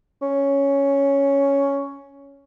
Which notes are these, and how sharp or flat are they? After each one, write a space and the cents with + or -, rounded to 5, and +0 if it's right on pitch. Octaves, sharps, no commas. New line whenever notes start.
C#4 +5